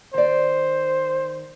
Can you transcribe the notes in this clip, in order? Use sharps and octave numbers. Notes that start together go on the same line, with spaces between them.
D#3 C5 D5